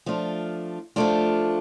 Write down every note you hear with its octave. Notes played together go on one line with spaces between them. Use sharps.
F3 A3 D4 F4
F3 A3 D4 F4